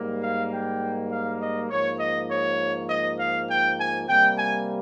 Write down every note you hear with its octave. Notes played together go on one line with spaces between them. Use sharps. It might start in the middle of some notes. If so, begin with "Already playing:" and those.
Already playing: G#2 G3 A#3
F5
G5
F5
D#5
G#2 F3 A#3 C#5
D#5
C#5
D#5
F5
G5
G#5
C3 G3 A#3 G5
G#5